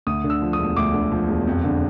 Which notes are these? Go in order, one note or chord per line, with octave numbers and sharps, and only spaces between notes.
D2 D#6
D3
E6
F3
D#6
E1
D2 D6
D3
F3
E1
F2
D3